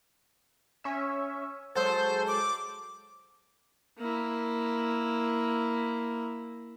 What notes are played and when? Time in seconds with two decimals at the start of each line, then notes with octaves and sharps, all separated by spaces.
0.84 C#4 E5
1.75 F#3 G#3 A4 C5
2.28 D6
3.99 A#3 E4